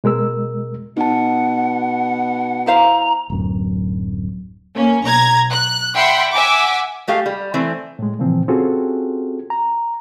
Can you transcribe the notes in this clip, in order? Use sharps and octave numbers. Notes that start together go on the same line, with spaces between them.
B2 G#3 A#4 E6
B2 D#4 F#5 A5
E4 C5 F5 A#5
D1 F#2
A#3 C#4
B1 A#5 G#6
F#6
D5 E5 F#5 G5 B5 C6
E5 F#5 G#5 D6
G#3 A3 G4 F5
G3
E3 A3 C4
A2 G#3
A#2 C#3 E3 F3 C4
C4 C#4 F4 F#4 G#4 A4
A#5